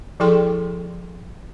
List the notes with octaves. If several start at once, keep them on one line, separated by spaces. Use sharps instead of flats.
F3 E4 G#4 A4 G5 C6